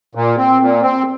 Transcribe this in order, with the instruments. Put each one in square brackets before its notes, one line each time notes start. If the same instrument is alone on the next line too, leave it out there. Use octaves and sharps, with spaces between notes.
[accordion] A#2
C4
A#2
C4